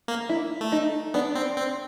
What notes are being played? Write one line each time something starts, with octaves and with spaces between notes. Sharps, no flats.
A#3
E4
A3
D#4
B3 D4
C4
C4